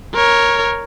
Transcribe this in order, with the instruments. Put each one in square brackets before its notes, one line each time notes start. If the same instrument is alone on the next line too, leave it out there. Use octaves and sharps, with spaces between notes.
[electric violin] A#4 C#5